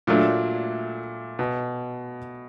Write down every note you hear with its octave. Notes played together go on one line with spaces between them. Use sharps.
A#2 F#3 A3 D4
B2